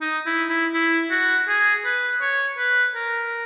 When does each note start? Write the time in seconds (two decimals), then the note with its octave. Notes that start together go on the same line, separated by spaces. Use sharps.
0.01 D#4
0.26 E4
0.49 E4
0.74 E4
1.11 F#4
1.48 G#4
1.85 B4
2.21 C#5
2.58 B4
2.95 A#4